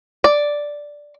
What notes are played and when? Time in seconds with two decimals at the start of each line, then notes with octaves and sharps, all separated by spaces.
0.24 D5